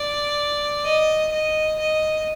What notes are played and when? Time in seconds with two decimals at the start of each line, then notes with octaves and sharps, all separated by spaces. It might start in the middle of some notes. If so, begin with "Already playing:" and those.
Already playing: D5
0.85 D#5
1.32 D#5
1.79 D#5